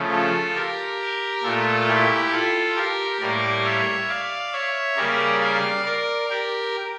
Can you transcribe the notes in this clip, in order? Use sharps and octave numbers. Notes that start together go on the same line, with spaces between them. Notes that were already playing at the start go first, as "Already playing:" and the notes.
Already playing: C#3 F3 A3
F4 A4
G4 A#4
A#2 A3 F4 A4
E4 G4
F4 A4
G4 A#4
A2 G3 A#3 A#4 D5
C#5 E5
D5 F5
C#5 E5
C#3 G3 A#3 A#4 D5
D5 F5
A#4 D5
G4 A#4